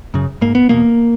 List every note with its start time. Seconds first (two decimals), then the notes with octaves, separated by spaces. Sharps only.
0.14 F#2 C#3
0.41 G#2 A#3
0.55 B3
0.69 E2 B2 A#3